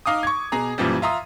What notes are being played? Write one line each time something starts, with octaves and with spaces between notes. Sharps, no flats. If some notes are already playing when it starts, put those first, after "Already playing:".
D#4 F5 D6 D#6
C#6 G#6
B2 G#4 A#5
F#2 A#2 E3 F3 G3
F4 E5 A#5 C6 D#6